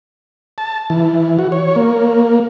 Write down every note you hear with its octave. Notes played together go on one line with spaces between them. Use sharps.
A5
E3
F#4
C#5
A#3